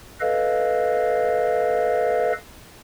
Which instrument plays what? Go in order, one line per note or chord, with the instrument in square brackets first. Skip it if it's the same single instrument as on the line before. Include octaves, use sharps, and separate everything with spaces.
[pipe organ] A4 B4 D#5 F5